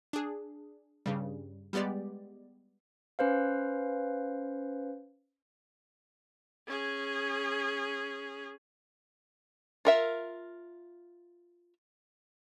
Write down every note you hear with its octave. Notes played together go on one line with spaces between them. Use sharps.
D4 G#4
G2 C#3 G3
G3 G#3 B3 G4 D5
C#4 B4 C5 F5
C#4 G#4
F4 A#4 E5